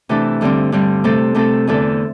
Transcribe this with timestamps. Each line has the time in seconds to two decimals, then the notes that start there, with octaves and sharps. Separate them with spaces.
0.09 C3 E3 A3 D4 A4
0.41 G2 D3 G3 C4
0.72 G2 D3 G3 C4
1.04 C3 A3 C4 A4
1.35 C3 A3 C4 A4
1.67 E2 D3 A3 D4 A4